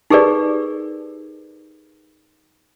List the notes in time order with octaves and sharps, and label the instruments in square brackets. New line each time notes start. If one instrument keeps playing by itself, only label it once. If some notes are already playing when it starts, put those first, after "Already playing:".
[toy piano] D#4 G4 G#4 A#4 B4 D5